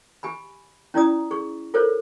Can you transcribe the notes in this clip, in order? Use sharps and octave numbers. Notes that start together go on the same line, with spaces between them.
G4 G#5 B5
C#4 E4 F4 D5 A#5 D#6
G#4 C#6
F4 A4 A#4 C5 C#5